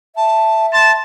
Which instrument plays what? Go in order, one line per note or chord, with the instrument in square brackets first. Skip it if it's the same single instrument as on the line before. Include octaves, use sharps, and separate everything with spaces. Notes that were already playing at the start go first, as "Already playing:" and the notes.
[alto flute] E5 [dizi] A5
[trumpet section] A5 [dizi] C6